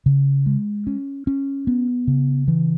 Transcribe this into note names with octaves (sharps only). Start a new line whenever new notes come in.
C#3
G#3
C#4
C#4
B3
C#3
E3